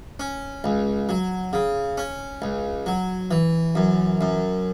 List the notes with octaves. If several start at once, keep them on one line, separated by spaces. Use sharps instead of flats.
C#4
C#2
F#3
C#3
C#4
C#2
F#3
E3
F#2
F#2